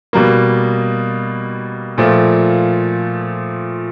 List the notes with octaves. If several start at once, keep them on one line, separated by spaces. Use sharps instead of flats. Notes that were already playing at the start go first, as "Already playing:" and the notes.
B2 G3 A#3
A#2 F3 A3